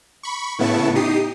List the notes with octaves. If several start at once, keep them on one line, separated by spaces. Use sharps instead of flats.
B5 C#6
A2 C#3 B3 E4 A5 C#6
D#4 G4 D#6 C7